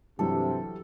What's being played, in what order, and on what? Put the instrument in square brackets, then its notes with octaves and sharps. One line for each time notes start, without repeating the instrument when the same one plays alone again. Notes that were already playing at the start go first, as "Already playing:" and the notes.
[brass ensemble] G2 C3 [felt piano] E3 F#3 G3 [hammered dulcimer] A4